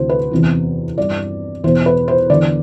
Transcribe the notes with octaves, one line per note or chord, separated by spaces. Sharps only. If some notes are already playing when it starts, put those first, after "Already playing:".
Already playing: D2 C3 E3 C5
B4
E2 C3 E3
G2 E3 D5
E2 B2 C5
B4
C5
E2 D3 D5